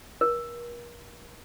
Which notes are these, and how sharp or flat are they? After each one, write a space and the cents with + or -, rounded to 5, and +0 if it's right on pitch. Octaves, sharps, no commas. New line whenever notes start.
A#4 +40